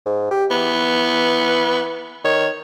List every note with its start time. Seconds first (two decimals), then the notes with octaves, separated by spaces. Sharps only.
0.06 G#2
0.31 G4
0.51 E3 B3
2.25 D#3 C#5